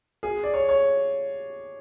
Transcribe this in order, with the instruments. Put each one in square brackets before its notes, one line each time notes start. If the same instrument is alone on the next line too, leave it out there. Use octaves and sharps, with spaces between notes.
[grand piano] G#4
D5
C#5
C#5